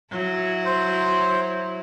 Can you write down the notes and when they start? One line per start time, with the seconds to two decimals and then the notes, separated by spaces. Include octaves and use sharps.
0.11 F#3 E4
0.65 C5